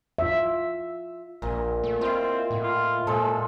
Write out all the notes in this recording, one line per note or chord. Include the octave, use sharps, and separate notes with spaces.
F4 E5
A#1 A#2
A3
C4 E4 F4 D#5
A2
F4
A#2 F3 G#3 A4